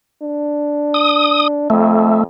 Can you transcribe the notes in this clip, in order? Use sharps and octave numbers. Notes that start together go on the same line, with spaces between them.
D4
D#6
F2 A3